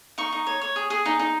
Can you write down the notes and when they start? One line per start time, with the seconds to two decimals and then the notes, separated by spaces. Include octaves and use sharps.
0.18 D#4 C#6
0.32 D#4
0.47 C#5
0.61 C#5
0.76 G#4
0.90 G#4
1.06 D#4
1.19 D#4